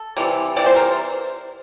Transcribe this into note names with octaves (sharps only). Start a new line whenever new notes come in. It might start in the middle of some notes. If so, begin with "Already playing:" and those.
Already playing: A4
C3 E3 G3
C3 E3 G3 D5
C5
A#4